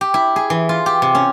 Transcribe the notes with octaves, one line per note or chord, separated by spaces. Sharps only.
G4
E4
G#4
E3
F4
G4
C3
C#4